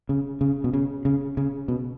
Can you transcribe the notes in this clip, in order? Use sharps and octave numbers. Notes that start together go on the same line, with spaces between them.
C#3
C#3
B2
C#3
C#3
C#3
B2